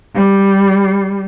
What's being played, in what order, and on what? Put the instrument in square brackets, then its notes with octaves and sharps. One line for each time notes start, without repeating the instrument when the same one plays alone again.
[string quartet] G3